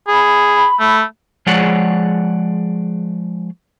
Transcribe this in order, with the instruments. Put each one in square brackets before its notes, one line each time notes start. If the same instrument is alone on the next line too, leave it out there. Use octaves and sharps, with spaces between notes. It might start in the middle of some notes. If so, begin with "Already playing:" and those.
[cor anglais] G#4 [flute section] B5
[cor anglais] A3
[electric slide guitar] F3 G#3 G#4 C#5 D5 F#5